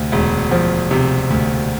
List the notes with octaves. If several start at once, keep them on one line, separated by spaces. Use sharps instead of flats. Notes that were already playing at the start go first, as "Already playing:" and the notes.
Already playing: D2 C3
E1
F3
C3
D2